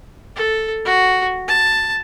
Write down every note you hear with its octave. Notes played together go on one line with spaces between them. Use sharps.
A4
F#4
A5